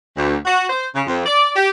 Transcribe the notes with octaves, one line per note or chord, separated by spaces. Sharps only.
D2
F#4
C5
C#3
F2
D5
G4